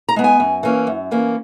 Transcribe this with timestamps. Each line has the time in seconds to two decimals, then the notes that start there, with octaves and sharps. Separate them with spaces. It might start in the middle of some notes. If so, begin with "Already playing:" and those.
0.09 A#5
0.16 G#3 B3
0.24 G#5
0.40 F#2
0.63 E3 A#3 C#4
0.87 F#2
1.11 E3 A#3 C#4